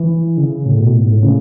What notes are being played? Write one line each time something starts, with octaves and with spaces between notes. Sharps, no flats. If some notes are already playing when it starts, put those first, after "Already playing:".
Already playing: E3
C#3
A2
B2
A2
G#2
A2
C#3